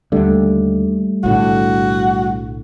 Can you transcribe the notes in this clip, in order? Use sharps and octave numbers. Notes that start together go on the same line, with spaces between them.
D#2 D3 G3 A3
B1 A2 D3 F#4